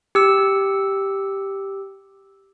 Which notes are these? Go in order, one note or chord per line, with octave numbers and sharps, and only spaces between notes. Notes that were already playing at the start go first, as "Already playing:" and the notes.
G4 E6